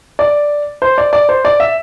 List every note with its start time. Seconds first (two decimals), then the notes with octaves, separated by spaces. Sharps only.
0.19 D5
0.82 C5
0.98 D5
1.13 D5
1.29 C5
1.45 D5
1.60 E5